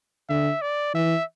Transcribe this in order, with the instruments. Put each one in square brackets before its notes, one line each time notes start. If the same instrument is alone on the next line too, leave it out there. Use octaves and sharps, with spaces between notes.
[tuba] D3 [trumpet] E5
[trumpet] D5
[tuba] E3 [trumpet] E5